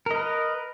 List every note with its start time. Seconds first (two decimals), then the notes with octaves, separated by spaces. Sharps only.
0.06 A#4
0.11 D#5
0.15 B4